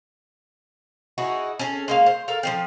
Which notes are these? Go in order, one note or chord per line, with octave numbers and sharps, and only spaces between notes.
D#4 E4 F#4 G#4
C#4 G#4 A4
G#3 A#3 F5
C5
A4 A#4 F5
F3 G3 C4